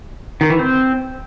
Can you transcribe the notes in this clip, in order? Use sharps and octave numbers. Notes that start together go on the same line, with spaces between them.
D#3
E3
C4